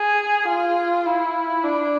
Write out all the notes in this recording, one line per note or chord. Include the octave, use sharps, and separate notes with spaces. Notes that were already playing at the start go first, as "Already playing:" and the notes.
Already playing: G#4
F4
E4
D4